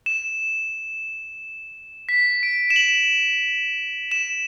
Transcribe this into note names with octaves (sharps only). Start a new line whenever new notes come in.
E7
B6
D7
E7
F#7
E7